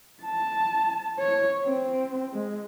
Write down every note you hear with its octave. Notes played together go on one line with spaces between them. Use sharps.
A5
C#5
C4
G#3